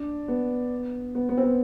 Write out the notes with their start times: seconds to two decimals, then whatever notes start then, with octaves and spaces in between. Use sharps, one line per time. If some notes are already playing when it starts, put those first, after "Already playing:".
Already playing: D4
0.28 B3
1.15 B3
1.29 B3
1.37 C4
1.43 B3